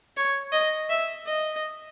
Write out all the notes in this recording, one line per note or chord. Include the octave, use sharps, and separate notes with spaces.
C#5
D#5
E5
D#5